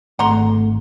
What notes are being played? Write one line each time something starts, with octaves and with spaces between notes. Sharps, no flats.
G#1 A3 F#5 A#5 C6